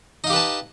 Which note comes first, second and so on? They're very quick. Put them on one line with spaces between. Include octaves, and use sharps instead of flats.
D#4 F5 G4 B4 A5